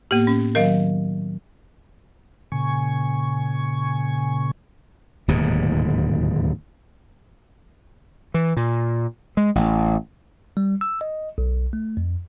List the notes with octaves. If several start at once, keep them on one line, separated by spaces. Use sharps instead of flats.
A2 A#3 B3 G4
C#4
D#3 F#3 A#4 D#5 F5
A#2 C#3 G#5 C#6
D1 D#2 G#2 B2
E3
A#2
G#3
A1
G3
E6
D#5
B1
A3
F2